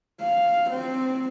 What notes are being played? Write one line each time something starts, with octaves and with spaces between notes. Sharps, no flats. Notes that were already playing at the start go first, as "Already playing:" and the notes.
F5
C4